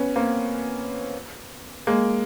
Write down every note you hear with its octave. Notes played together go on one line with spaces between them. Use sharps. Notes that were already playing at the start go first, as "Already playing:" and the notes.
Already playing: B3 C#4
A#3 C4
G#3 A#3